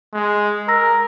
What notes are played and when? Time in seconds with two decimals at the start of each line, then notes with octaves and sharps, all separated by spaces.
0.14 G#3
0.68 A#4 A#5 E6 A#6